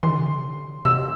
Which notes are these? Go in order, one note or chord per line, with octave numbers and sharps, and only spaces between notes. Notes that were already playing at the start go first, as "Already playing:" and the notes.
E3 C6
D3
C3
D3
C3 E6